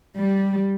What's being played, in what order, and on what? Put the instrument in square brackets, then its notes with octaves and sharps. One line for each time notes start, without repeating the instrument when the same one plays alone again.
[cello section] G3